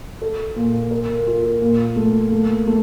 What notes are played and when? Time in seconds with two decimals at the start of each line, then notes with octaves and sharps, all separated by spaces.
0.22 A4
0.56 A#2
0.91 A#4
1.27 F4
1.62 A#2
1.96 A3
2.32 A3
2.67 A3